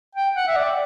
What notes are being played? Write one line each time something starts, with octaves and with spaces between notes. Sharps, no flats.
G5
F#5
E5
D5